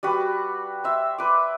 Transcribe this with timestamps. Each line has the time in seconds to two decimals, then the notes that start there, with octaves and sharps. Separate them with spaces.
0.03 G3 F#4 B4
0.84 C5 E5
1.18 B4 D6